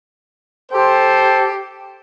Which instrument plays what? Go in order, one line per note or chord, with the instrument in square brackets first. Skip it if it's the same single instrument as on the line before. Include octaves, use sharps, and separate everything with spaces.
[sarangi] G4 [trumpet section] A4 C5